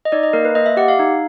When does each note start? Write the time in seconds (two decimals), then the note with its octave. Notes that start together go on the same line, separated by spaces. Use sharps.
0.05 D#5
0.12 D#4 D5
0.23 D#5
0.33 A#3 A#4
0.45 B4
0.55 A#3 D#5
0.66 E5
0.77 G4 F#5
0.88 F5
0.99 D#4